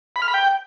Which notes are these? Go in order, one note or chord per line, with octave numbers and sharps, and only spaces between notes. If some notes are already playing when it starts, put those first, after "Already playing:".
B5
F6
B5
G5